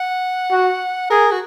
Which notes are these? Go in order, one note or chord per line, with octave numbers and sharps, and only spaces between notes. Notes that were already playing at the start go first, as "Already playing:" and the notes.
Already playing: F#5
F#4
G#4 A#4
F#4